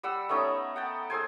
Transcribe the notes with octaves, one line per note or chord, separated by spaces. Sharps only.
G3 F#5 E6
A3 B3 C#4 D#4
F#5 G5 A5
G#4 A4 C5 G#5